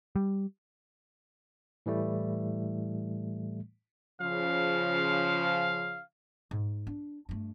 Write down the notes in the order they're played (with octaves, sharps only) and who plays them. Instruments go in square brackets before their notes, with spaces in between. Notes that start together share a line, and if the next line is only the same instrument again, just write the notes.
[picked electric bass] G3
[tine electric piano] A2 E3 G3 A3
[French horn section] C#3 F3 [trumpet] F5
[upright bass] G#2
D4
G2 A3